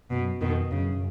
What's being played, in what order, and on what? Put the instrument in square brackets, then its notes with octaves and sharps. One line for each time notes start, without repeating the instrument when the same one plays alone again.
[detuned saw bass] F#2 [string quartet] B2
[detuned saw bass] F2 [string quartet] B2 D#3
[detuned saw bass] F#2 [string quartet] C#3